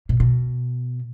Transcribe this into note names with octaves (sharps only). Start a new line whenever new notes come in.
B2
B2